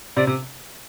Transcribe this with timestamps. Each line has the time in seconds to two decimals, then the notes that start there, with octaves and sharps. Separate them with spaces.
0.16 C3 D5
0.27 C3